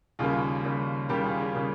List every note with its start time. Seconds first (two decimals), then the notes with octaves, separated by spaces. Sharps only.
0.19 D#2 C#3 G3 A#3 F4 G#4
0.64 D#2 C#3 G3 A#3
1.09 D#2 C#3 G3 A#3 G4 A#4
1.24 F4 G#4
1.39 F4 G#4
1.54 C#3 G3 A#3